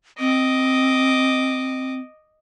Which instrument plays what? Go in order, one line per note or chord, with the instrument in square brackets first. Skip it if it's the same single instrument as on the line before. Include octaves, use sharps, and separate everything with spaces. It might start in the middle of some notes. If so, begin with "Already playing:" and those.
[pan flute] C4 [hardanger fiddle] D#5 D6